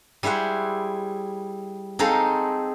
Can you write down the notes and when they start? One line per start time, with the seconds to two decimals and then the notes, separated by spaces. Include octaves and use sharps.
0.23 G3 E4 G#4 C5 F#5
1.99 C4 D#4 G#4 A4 F5